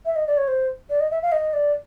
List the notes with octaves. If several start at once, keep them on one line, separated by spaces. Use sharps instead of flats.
E5
D#5
D5
C#5
C5
D5
D#5
E5
F5
D#5
D5